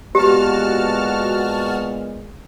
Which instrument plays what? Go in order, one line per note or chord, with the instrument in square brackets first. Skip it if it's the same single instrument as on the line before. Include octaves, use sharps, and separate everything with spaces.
[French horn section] A#2 G#3 B3 [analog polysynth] F#4 A5 F6 [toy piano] G4